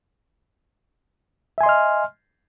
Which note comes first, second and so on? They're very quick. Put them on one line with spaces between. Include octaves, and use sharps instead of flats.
E5 G#5 C6 D#5 F6